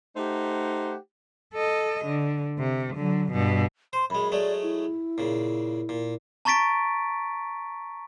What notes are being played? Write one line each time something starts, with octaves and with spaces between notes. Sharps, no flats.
A3 D#4 G4 C5 F#5 A#5
A4 D#5
D3
C3
D3 F#3
G2 B2
C5 C6
F#2 G#3 B5
F#3 G#3 A3 D5
E4
A#2 C#3
A#2
A5 A#5 C#6 A6 B6 D7